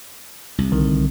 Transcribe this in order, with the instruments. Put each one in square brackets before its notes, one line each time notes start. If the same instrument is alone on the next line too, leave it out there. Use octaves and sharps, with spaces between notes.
[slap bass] C2
[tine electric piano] B1 D3 D#3